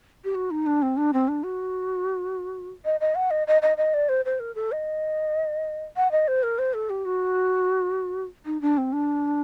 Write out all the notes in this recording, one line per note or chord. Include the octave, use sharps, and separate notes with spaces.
G4
F#4
D#4
D4
C4
D4
C4
D4
F#4
D#5
D#5
F#5
D#5
D#5
D#5
D#5
D5
C5
C5
A#4
A4
D#5
F#5
D#5
C5
A#4
C5
A4
G4
F#4
D#4
D4
C4
D4